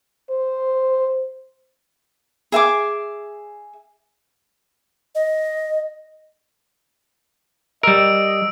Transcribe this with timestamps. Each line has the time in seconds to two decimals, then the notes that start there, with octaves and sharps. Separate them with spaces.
0.31 C5
2.52 G#4 E5 G#5 D6
5.15 D#5
7.83 G3 A#4 D#5 E6 D7